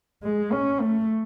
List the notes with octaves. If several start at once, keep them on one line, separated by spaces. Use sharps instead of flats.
G#3
C#4
A3